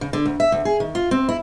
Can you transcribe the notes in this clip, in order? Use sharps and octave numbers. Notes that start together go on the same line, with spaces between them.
C#3
D3
D2
E5
D2
G#4
D#3
F4
C4
E4